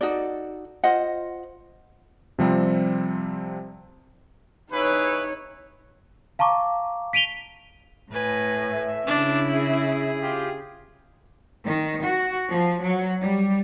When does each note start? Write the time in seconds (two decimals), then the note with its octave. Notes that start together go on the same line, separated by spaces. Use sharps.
0.01 D#4 F#4 A4 D5
0.84 F4 C5 D#5 F#5
2.39 C3 F3 G3 C4
4.72 D#4 E4 G#4 B4 C#5
6.39 F5 A5 A#5 C#6 D6
7.13 B6 D7 D#7 F7 G7
8.12 A2 B4 G#5
8.70 E5
9.07 C#3 D4 E4
9.52 G#4
10.22 F4 G4
11.65 D#3
12.03 F#4
12.50 F3
12.83 F#3
13.21 G3